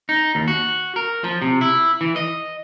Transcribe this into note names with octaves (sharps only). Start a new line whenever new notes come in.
D#4
D#2
F#4
A#4
F3
C3
E4
E3
D#5